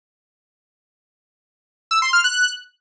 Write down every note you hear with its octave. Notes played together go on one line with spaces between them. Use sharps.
E6
C6
F6
F#6